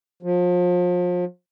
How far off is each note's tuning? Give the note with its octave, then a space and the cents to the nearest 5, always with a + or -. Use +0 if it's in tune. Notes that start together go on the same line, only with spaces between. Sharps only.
F3 +35